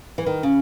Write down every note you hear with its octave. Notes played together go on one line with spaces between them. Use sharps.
E3
D#3
C#3